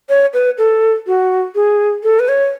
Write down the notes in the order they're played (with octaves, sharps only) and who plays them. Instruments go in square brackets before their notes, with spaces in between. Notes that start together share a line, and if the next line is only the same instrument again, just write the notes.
[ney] C#5
B4
A4
F#4
G#4
A4
B4
C#5